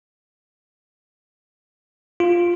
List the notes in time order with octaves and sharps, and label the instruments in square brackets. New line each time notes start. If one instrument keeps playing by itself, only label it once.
[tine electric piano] F4